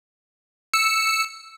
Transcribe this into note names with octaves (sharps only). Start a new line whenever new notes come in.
E6 C#7